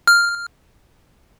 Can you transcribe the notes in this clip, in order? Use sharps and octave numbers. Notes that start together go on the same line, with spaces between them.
F6